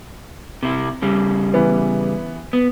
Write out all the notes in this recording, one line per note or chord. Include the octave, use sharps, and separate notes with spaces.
C3 E4
C#3 G3
E3 B3
B3